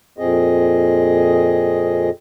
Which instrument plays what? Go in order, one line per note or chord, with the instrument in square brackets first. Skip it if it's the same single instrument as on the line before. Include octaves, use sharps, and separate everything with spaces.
[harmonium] F2 A#2 C4 G#4 D#5